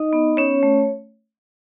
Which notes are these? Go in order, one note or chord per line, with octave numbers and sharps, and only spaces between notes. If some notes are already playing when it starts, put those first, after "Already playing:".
Already playing: D#4 D#5
B3
C#4 C#5
A3